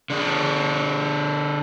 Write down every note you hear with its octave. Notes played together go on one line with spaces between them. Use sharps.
D3 D4 G#4 A#4